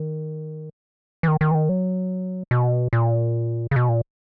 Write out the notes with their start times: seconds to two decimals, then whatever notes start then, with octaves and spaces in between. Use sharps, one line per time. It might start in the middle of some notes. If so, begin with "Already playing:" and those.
Already playing: D#3
1.23 E3
1.28 D#3
1.41 D#3
1.51 E3
1.55 D#3
1.69 F#3
2.51 B2
2.93 A#2
3.71 C#3
3.76 B2
3.89 A#2